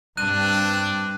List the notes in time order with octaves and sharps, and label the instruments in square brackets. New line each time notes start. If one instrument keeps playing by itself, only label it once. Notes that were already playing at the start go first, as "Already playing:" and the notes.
[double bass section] G2 [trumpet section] C4 D4 [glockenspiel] F#6 D#7